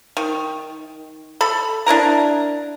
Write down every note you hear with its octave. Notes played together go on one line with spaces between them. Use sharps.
D#3
A4 B5
D4 E4 A#4 A#5